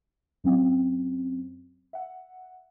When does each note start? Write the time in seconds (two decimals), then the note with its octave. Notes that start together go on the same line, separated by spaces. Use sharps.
0.44 F#2 F#3 C4
1.93 E5 F#5